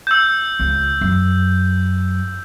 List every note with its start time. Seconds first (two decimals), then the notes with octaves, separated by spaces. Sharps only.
0.07 E6 G6
0.59 C#2
1.01 F#2